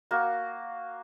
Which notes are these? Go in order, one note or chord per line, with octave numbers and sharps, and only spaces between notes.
A#3 F#4